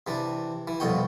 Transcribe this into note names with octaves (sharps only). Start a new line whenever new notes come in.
C3 E3 D4
E3
C2 F2 B2 C#5 G5